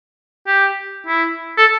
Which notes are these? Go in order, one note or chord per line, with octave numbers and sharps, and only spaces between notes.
G4
E4
A4